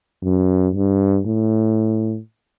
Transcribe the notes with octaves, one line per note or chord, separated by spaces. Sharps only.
F#2
G2
A2